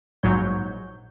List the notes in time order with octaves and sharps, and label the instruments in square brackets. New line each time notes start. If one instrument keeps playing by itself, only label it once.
[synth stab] A#1 G#2 F#3 C#5 G6